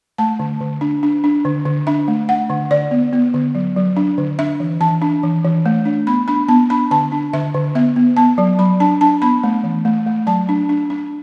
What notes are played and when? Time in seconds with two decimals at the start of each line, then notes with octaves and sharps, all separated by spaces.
0.18 A3 A5
0.39 D3
0.60 D3
0.81 D4
1.03 D4
1.24 D4
1.45 D3
1.65 D3
1.87 D4 E5
2.08 A3
2.29 D4 F#5
2.50 D3
2.71 D3 D5
2.91 B3
3.13 B3
3.34 D3
3.55 F#3
3.76 F#3
3.97 D4
4.18 D3
4.39 D4 E5
4.60 E3
4.81 E3 A5
5.02 D4
5.23 E3
5.45 E3
5.66 A3
5.85 D4
6.07 B3 B5
6.28 D4 B5
6.48 B3 A5
6.70 D4 B5
6.91 D3 A5
7.12 D4
7.33 D3 E5
7.54 D3
7.75 B3 E5
7.96 B3
8.17 B3 A5
8.38 F#3
8.59 F#3 B5
8.80 D4 A5
9.01 D4 A5
9.22 B3 B5
9.44 A3
9.64 E3
9.85 A3
10.06 A3
10.27 F#3 A5
10.49 D4
10.69 D4
10.90 D4